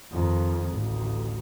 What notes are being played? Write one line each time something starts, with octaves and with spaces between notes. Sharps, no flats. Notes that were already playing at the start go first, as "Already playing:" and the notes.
F2 D#3
A1 D2